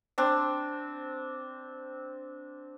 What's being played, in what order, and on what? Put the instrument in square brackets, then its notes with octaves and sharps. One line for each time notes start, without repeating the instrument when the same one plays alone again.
[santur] C4 D4